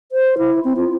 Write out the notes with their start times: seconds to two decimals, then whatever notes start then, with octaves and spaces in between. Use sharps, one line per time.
0.12 C5
0.38 E4
0.64 C4
0.77 F4